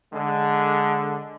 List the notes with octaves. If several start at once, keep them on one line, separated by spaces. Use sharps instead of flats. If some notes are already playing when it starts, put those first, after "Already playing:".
D3 G#3